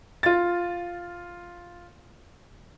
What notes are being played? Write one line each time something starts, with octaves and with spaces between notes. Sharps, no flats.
F4 A6